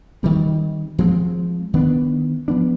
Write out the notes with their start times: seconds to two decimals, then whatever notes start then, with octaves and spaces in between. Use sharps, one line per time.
0.23 D#3 G3 C4
0.98 F3 G#3 C4
1.74 D#3 B3 D4
2.48 F3 B3 D4